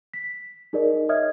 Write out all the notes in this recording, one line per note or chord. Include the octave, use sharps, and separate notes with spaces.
B6
D#4 G#4 A#4 D5 D#5
C#5 D#5 E5 D#6 F6 G#6